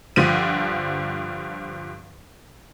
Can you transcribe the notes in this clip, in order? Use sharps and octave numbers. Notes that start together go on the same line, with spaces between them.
G2 D3 F3 D#7